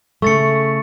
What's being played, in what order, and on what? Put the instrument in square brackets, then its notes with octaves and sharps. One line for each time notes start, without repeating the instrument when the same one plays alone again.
[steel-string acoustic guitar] C#3 A3 [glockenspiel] C#6 A6 C#7